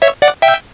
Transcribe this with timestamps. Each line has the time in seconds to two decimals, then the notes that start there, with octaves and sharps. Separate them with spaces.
0.02 C#5 E5
0.22 D5 F#5
0.42 E5 G5